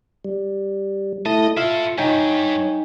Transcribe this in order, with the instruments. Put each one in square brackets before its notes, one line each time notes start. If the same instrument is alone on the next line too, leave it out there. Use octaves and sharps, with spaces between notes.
[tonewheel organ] G3
[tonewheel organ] A3 E4 [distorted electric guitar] D#5 [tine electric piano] A5
[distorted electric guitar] E4 A4 [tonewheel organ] F4 [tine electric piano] E5 F5
[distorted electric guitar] G2 [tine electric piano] D#4 G5 G#5 [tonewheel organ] C#5